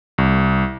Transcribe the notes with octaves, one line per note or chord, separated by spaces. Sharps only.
C2